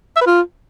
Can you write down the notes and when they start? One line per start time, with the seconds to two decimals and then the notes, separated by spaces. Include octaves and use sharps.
0.16 E5
0.21 B4
0.26 F4